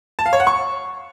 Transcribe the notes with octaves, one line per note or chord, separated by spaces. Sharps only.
A5
F5
C#5
F#5
C#6